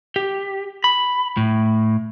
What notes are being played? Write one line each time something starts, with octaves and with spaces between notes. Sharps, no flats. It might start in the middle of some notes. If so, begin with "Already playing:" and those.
G4
B5
A2